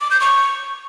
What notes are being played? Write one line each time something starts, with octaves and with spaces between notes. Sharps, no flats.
D6
G6
C#6